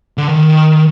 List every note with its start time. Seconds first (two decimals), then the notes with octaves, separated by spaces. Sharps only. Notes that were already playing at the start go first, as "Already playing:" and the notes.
0.18 D3
0.28 D#3